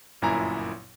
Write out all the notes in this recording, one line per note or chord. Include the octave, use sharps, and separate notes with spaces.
G1 F#2 A#2 E4 G#5 A#5